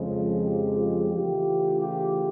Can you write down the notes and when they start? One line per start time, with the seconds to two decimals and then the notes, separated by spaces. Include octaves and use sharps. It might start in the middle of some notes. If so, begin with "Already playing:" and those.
Already playing: F2 C#3 F3 G#3
0.44 F4 G4
1.12 C#3 E3 A3 F4 G4
1.80 F4 G4